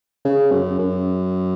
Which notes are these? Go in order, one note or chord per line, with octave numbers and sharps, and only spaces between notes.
C#3
F#2
F#2